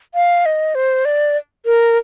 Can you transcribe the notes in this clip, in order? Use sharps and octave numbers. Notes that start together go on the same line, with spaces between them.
F5
D#5
C5
D5
A#4